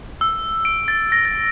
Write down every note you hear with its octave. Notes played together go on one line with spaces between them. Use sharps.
E6
D7
A6
A#6
A6